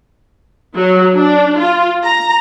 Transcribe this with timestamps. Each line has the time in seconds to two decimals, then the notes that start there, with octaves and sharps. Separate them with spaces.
0.75 F#3
1.16 D4
1.60 F4
2.04 A#5